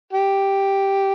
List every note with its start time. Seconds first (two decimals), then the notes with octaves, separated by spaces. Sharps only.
0.13 G4